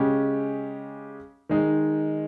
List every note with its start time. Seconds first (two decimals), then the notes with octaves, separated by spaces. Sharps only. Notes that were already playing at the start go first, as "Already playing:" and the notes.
Already playing: C#3 G#3 C#4 G4
1.49 D#3 G#3 D#4